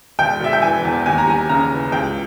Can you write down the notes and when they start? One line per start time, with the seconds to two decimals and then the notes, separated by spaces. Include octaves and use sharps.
0.19 E1 G5
0.40 E1 E5
0.53 G5
0.62 E3 G#5
0.84 E2
1.06 D#2 G#5
1.18 A#5
1.27 G3 G#5
1.49 C#3 A#5
1.71 E3
1.92 C#2 G5